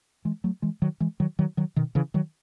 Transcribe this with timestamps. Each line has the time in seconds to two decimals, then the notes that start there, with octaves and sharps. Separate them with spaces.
0.25 E3 G#3
0.44 F#3 A3
0.62 E3 G#3
0.82 D#3 F#3
1.00 E3 G#3
1.20 D#3 F#3
1.39 D#3 F#3
1.57 D#3 F#3
1.76 B2 D#3
1.95 C#3 E3
2.14 D#3 F#3